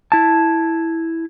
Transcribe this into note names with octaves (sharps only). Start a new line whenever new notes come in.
E4 A5